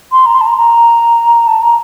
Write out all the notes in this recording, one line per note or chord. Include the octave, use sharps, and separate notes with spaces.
C6
A#5
C6
A5
A#5
A#5
A5
A#5